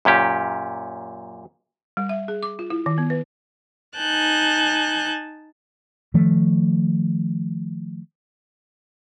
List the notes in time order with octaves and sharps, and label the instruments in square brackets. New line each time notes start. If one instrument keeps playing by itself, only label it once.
[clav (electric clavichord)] F#2 A#2 C#4 G4
[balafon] G3
E5
G#4
D6
F4
E4
D#3
B3
B4
[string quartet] D#4 G#5 A5 F#6 G6
[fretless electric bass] D#3 F3 A3